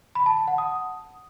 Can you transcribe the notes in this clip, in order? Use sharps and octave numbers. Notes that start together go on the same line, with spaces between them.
B5
A5
A5
F#5
D#6